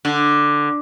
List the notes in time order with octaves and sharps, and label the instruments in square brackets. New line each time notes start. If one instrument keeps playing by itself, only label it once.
[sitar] D3